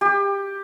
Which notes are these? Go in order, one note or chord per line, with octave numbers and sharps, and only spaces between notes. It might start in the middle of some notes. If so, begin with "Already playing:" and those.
G4